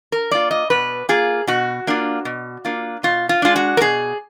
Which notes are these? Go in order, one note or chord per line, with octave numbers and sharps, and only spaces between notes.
A#4
A#3 F4 D5
D#5
B2 B4
A#3 F4 G#4
B2 F#4
A#3 D4 F4
B2
A#3 D4 F4
B2 F4
F4
G#3 D4 F4
F#4
A#4
B2 G#4